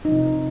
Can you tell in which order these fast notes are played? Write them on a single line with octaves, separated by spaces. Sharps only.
D#4 F3 C3